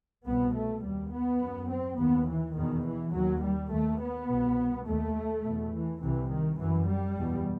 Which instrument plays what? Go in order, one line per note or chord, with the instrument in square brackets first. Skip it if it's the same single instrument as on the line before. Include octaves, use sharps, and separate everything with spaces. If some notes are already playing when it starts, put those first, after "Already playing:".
[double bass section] C2 B2 B3
A3
D#2 G3
B3
F#2
C4
D#2 B3
E3
E2 B2 D#3
E3
D#2 F#3
G3
D#2 A3
B3
C2 B2
D#2 A3
E2 B2
E3
C2 C3 E3
D#3
F#2 E3
G3
E2 B2